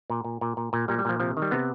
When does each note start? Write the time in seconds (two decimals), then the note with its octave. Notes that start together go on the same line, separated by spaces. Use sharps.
0.10 A#2
0.24 A#2
0.41 A#2
0.57 A#2
0.73 A#2
0.88 A#2 G3
0.98 G3
1.05 A#2 F3
1.20 C3 F3
1.37 D#3
1.42 G3
1.51 C3 B3